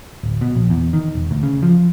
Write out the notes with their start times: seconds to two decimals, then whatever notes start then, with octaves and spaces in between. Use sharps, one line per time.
0.23 D1
0.41 B2
0.55 A#1
0.70 E2
0.93 D#3
1.15 E1
1.31 D2
1.43 C#3
1.63 F3